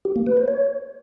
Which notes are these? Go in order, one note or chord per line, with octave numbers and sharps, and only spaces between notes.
G4
A#3
B4
C5
C#5